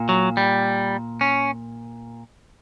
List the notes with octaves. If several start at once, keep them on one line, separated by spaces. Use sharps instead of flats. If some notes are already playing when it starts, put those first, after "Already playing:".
Already playing: A#2
F#3
G3
C#4